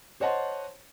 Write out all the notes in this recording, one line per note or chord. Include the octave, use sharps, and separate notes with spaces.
C5 C#5 D#5 F#5 A5 C6